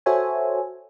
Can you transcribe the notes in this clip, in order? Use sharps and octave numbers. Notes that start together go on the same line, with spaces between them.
F#4 A4 C5 C#5 E5 G#5